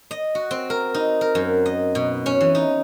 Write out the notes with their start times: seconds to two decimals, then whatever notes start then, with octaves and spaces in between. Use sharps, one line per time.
0.11 D#5
0.35 F#4
0.51 C4
0.70 A#4
0.94 D#4
1.21 A#4
1.35 F#2
1.66 D#5
1.95 B2
2.26 C#4
2.41 E3
2.55 D#4